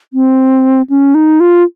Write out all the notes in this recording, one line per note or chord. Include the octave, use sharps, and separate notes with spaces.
C4
C#4
D#4
F4